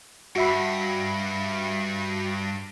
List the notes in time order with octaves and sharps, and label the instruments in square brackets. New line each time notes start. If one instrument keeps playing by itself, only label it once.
[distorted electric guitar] G2 [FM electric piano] F#4 E5 B5